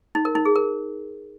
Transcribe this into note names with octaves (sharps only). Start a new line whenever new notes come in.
D#4
A#4
D#4
G#4
A#4